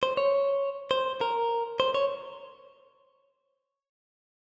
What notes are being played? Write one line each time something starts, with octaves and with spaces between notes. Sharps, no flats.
C5
C#5
C5
A#4
C5
C#5